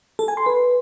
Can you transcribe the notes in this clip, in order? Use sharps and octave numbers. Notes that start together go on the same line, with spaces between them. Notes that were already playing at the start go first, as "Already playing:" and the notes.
A4
G#5
C6
B4